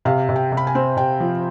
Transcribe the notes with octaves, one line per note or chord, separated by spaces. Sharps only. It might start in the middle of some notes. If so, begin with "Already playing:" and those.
C3 F5
C3
G5
C3
B5
G#5
C4
C3 G5
F3